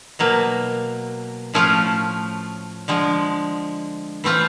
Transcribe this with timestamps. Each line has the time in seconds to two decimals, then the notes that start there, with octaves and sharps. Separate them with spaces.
0.19 B2 F#3 A#3
1.54 A2 F3 A3 C#4 F4
2.88 D3 F3 G#3
4.24 E3 A3 C4 F4